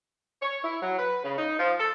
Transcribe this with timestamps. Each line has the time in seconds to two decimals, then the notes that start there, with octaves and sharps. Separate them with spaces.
0.43 C#5
0.64 E4
0.83 F#3
0.99 B4
1.24 C#3
1.38 D#4
1.60 F3
1.80 A4